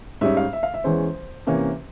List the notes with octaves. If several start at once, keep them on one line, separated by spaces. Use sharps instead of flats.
G#2 G3 C#4 E5
F5
E5
F5
E5
E2 E3 G#3 C#4 C5
C3 E3 A#3 C#4